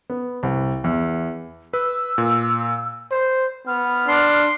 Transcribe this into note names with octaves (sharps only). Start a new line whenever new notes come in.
B3
C2
E2
B4 E6
A#2
C5
B3 F6
D4 C6